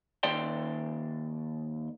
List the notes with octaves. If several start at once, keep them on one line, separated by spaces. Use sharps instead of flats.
D#2 D5 G5 C6